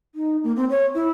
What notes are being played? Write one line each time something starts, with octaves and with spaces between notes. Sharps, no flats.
D#4
A#3
C4
C#5
E4